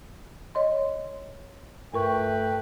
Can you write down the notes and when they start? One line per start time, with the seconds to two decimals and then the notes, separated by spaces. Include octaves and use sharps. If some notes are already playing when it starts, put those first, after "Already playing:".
0.55 C#5 D#5 C6
1.94 G2 A3 A#4 B4 G5 C#6